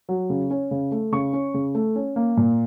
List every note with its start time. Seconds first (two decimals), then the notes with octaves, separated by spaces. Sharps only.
0.09 F#3
0.30 C#3
0.50 C#4
0.71 C#3
0.92 A3
1.12 C#3 C#6
1.33 C#4
1.54 C#3
1.75 A3
1.96 C#4
2.16 A#3
2.37 A#2